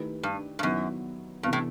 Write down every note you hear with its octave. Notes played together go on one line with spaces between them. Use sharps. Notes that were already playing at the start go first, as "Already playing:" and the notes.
Already playing: D#3 A3 E4 G4 B4
G2
G2
F#2 D#3 F#3 B3 E4
G2 C3 E3 B3
A2